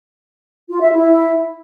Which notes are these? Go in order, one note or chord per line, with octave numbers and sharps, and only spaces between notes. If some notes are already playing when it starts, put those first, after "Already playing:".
F4
E5
E4